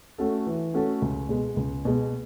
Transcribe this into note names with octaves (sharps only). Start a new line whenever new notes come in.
A3 C#4 F#4 A4
E3
A3 C#4 F#4 A4
C#2
B2 G#3
C#2
B2 G#3